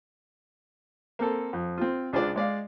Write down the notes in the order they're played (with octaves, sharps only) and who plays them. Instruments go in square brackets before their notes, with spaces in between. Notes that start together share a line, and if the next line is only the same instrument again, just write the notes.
[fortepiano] A#3 C4 A4
F2
C4 F4
C#2 D4 F4 G#4 C5 D5
G#3 D5 F5